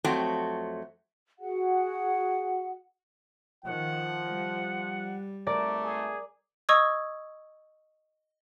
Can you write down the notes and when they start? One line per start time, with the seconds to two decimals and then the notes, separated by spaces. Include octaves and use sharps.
0.04 F2 F#3 A3 C4 G5
1.39 F#4 G#4 F#5
3.64 D#3 F3 F#5
4.25 G3
5.47 G#1 A3 A#4 D5
5.83 G#4
6.69 D#5 C#6 D#6 E6 G#6